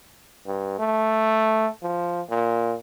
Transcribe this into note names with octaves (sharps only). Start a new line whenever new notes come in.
G2
A3
F3
A#2